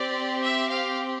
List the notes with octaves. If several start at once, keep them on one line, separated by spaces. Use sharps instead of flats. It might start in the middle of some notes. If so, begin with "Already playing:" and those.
Already playing: C4 G4 D5
E5
F5